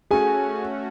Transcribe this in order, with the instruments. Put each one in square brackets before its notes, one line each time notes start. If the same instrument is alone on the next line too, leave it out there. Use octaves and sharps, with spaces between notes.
[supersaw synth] A3 C#4 F#4 [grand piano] G#4 G#5